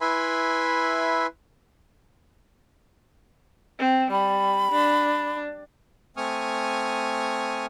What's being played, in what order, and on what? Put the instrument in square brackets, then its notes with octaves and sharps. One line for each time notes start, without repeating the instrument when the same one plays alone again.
[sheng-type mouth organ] E4 B4 E5 G#5 B5 C6
[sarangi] C4
[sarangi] G3 [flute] B5
[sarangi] D4
[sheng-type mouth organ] A3 C4 G#5 C#6 D#6 F6